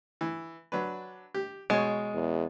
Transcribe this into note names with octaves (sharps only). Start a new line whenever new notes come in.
E3
F#3 D4 B4
G4
B2 G#3 C#5
E2